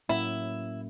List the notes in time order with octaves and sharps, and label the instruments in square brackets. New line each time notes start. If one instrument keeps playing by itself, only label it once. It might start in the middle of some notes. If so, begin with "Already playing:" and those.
[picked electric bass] A2 F#3 A#3 C#4 [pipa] E4